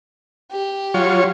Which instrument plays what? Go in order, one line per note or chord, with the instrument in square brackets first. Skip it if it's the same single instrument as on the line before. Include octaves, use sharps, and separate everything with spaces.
[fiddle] G4
[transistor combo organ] F#3 F4 C#5